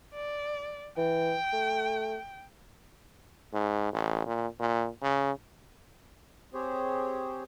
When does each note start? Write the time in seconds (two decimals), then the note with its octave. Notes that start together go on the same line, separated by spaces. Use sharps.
0.14 D5
0.97 E3 G5
1.53 A3
3.53 G#2
3.93 A1
4.26 A#2
4.59 A#2
5.02 C#3
6.54 C4 G4 G#4 C5 C#5